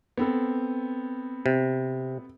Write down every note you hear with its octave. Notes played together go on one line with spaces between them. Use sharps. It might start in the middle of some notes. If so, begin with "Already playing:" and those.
B3 C4 A4
C3